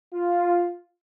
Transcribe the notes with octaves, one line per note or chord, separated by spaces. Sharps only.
F4